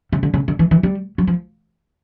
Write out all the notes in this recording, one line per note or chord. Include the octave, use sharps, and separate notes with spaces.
C#3
D3
C#3
D3
E3
E3
G3
F#3
F3